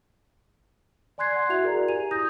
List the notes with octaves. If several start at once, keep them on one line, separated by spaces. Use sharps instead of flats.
D5 G#5 C6 F#6 G#6 C7
F#5 G#6
E4 F#4 E5 F7
G#4 A#4 D5 A#5
G4 G#5 D#7 F7
E4 D#6 G6 A#6